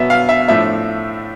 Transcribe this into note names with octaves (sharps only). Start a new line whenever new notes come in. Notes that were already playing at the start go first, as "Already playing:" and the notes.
Already playing: B2 F#3 B3 E5
F5
E5
A2 F3 A3 D4 E5